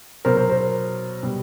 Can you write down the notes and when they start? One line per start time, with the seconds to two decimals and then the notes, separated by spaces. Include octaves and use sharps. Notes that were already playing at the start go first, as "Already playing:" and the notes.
0.25 B2 F#3 A#4 C5
0.37 A#4 C5
0.49 A#4 C5
1.23 B2 G3